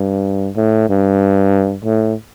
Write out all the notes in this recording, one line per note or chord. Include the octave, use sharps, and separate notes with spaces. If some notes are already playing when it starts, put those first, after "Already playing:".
Already playing: G2
A2
G2
A2